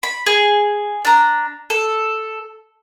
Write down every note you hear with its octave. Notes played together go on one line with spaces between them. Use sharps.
B5
G#4
D4 A#5
A4